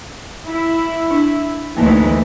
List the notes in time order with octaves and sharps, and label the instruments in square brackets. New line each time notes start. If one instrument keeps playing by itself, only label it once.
[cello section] E4
[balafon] D4
[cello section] D2 D#3 E3 [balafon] A3 A#3